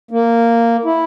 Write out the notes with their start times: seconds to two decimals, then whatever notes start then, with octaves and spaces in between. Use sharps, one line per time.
0.11 A#3
0.85 E4